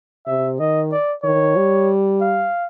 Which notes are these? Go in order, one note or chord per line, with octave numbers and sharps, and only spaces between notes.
C3 E5
D#3 D#5
D5
D#3 C#5
G3
F5